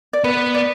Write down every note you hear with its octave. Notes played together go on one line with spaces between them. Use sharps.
D5
B3 B4
D5